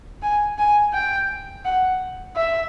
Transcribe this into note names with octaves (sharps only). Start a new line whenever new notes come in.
G#5
G#5
G5
F#5
E5